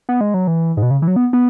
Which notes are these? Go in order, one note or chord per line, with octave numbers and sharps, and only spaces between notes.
B3
G#3
F#3
E3
G#2
B2
C#3
E3
F#3
B3
B3